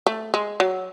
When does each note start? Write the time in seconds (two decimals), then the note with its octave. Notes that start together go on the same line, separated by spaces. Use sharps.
0.07 A3
0.34 G#3
0.60 F#3